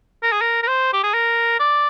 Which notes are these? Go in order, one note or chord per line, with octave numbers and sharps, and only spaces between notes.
A#4
G#4
A#4
A#4
C5
G4
G#4
A#4
D5